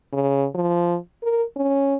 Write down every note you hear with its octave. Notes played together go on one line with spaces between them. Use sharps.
C#3
F3
A#4
C#4